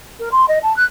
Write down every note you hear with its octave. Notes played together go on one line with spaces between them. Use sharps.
A#4
C6
D#5
A5
F#6